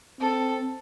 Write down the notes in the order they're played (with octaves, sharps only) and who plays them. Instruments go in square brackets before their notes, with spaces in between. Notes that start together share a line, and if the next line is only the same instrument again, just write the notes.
[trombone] C4 [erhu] A4